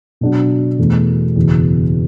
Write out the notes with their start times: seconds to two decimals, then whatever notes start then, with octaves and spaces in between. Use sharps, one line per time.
0.21 B2 F#3 D4 F#4
0.78 E2 B2 A3
1.36 F#1 E2 B2